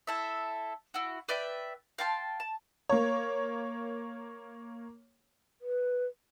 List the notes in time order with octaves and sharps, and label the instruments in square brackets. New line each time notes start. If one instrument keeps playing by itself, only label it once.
[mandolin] E4 A4 E5
E4 F#4
B4 D5 E5 G5
F5 G5 A5 C6
A5
[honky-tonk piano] A#3 C#5
[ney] B4